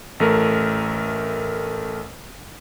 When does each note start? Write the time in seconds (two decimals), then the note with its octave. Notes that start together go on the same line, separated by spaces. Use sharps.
0.20 A1 A3 A#4